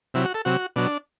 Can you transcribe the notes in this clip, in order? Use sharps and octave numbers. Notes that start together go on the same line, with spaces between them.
C3 F#3 E4
F#4
A4
C3 F#3 F#4
B2 F#3 D4